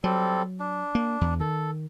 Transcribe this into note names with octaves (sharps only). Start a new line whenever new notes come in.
F#3 G3 C4 A4
D4
A#3
E2
D#3 A4